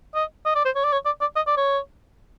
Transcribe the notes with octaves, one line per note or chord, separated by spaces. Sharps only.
D#5
D#5
D5
C5
C#5
D5
C#5
D5
D5
D#5
D5
C#5